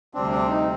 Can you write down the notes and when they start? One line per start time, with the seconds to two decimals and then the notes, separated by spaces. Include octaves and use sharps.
0.14 D2 C3 G3 C4 D4
0.32 D4
0.49 D#4